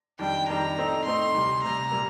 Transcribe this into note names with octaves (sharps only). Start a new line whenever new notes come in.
F2 D#3 G3 D4 G5
F2 D#3 G3 D4 A#5
A2 A3 C4 D#4
A2 A3 C4 D#4 C6
D2 C3 G3
D2 C3 G3 A#5
A#2 G3 A#3